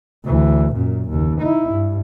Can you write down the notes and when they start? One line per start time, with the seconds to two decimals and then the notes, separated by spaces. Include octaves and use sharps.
0.24 D2 E3
0.73 F#2 A#2
1.10 F#1 D#2
1.41 D#4 E4
1.70 G2